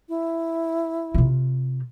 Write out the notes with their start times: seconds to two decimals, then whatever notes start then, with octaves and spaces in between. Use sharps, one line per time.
0.09 E4
1.14 C3 F4